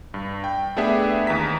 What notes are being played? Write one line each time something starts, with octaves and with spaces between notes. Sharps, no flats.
G2
G5
A3 B3 D4 G4 G#4 E5
D#2 E3 D#4 A#5 B6